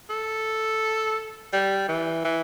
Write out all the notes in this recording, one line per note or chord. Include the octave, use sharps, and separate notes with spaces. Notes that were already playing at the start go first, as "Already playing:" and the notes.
A4
G3
E3
E3